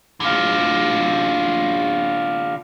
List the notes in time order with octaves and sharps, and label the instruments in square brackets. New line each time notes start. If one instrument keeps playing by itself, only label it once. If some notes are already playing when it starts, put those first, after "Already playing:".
[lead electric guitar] D3 F4